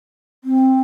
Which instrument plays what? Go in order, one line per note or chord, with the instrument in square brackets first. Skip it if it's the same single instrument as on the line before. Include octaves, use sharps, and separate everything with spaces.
[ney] C4